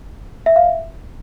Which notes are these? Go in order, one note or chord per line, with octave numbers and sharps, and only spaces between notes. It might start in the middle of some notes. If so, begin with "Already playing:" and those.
E5
F5
E5